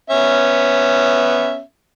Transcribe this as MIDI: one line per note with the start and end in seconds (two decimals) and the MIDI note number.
0.10 1.61 59
0.10 1.61 61
0.10 1.61 76